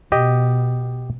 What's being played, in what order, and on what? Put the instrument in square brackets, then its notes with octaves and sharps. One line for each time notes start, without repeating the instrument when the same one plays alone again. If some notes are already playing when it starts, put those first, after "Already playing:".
[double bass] B2 [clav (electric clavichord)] G4 D#5